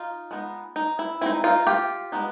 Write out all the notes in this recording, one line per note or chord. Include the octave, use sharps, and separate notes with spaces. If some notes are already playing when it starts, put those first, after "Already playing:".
Already playing: D#4 F4
G#3 B3 D#4
D#4
E4
G#3 C4 D#4 E4
D#4 F4
F4 G4
G#3 B3 D#4